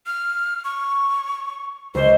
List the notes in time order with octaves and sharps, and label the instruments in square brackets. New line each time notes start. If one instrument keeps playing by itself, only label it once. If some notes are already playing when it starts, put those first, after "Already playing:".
[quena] F6
C#6
[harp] C#2 [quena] C5